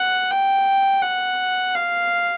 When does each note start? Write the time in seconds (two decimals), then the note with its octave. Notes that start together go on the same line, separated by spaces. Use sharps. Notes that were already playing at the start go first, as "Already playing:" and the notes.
Already playing: F#5
0.31 G5
1.02 F#5
1.75 F5